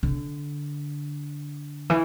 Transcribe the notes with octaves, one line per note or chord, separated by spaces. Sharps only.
D3
E3